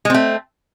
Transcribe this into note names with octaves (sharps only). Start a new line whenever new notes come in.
G#3 A3 C4